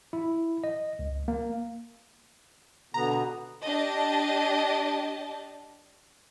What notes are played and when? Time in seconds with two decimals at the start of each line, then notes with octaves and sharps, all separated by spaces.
0.13 E4
0.64 D#5
0.99 C#2
1.28 A#3
2.94 B2 D3 B3 A#5
3.63 D4 G4 D#5 A5